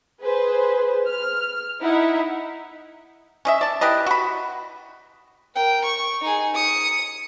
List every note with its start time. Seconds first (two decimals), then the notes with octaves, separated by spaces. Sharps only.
0.21 G#4 B4 C5
1.07 F6
1.82 D#4 E4 E5 F#5
3.45 C#4 D#5 E5
3.61 D5 A5
3.81 E4 G4 B4 D#5
4.06 F#4 B5
5.55 A#4 G5
5.85 C#6
6.22 D#4 G#4
6.54 D#6 C#7